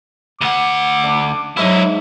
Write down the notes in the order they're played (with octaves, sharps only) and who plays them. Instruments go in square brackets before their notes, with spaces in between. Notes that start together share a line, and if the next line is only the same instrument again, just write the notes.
[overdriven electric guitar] D2 F#5 [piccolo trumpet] D6
[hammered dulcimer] D4
[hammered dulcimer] G#2 E5 [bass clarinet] F#3 [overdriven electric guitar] D#4 E4